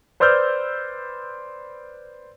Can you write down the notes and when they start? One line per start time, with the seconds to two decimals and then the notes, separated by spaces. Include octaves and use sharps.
0.20 B4 C5 D5 E6 F6 G6